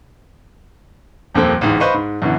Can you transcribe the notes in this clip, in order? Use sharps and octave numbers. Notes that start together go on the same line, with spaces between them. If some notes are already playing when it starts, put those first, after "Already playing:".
D#1 F2 A#3 C4 A4 G5
A1 D2 G#2
B4 C5 D#5 F5 B5 C#6
G#2
F#2 B2 D3 E3